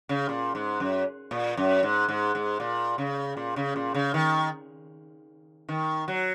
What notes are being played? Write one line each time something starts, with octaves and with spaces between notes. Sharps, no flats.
C#3
A#2
G#2
F#2
A#2
F#2
G#2
G#2
G#2
A#2
C#3
A#2
C#3
A#2
C#3
D#3
D#3
F#3